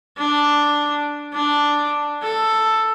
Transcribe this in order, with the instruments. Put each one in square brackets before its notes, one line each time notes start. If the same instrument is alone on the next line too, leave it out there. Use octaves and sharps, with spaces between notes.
[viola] D4
D4
A4